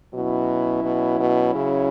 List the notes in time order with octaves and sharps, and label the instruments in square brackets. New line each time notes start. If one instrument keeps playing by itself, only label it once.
[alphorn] B2 [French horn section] F#3 C#4 E4
[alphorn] B2
B2
C#3